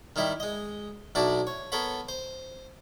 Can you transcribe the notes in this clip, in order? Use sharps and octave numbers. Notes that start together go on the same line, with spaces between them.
D#3 G3 E4 D#5
G#3 D#5
B1 D4 E4 F#4 D5 A5
C#5
B3 A4 A#4 C#5 F#5 B5
C5